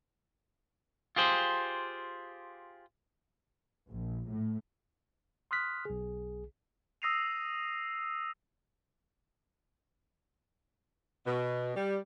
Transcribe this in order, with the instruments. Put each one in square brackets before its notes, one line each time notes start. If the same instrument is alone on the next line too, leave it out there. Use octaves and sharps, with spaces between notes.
[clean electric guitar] F4 G4 G#4 C5
[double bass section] A#1
A2
[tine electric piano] C6 D#6 F6 F#6 B6
B1 G#4
[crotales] D#6 E6 A#6 C7 D#7 F7
[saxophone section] B2
G3